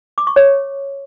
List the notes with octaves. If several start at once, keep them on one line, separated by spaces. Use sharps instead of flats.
D6
C#6
C#5